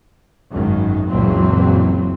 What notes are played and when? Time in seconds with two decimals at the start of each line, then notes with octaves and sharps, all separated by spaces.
0.51 G#1 F#2 D#3 F#3
1.10 F#1 C#2 A#2 E3 F#3 C4